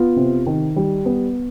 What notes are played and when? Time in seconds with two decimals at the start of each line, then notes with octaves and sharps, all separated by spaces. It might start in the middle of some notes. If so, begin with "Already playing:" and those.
Already playing: B3 F4
0.16 C3
0.46 D#3
0.76 G3
1.05 B3